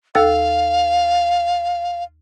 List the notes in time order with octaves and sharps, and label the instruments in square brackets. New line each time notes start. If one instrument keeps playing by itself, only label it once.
[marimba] D#2 A4 E6 [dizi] F5